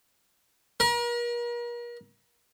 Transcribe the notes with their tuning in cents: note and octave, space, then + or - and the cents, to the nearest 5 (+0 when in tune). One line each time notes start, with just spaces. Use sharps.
A#4 +40